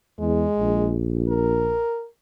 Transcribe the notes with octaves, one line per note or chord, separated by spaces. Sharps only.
E2 G#3
A#1
A#4